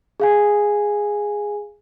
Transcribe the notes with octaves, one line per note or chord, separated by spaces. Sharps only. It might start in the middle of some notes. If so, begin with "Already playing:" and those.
G#4 F5 G#5